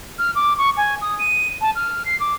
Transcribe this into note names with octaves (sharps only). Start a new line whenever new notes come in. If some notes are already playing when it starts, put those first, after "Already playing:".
F6
D6
C#6
G#5
D#6
D#7
A5
F6
C7
D6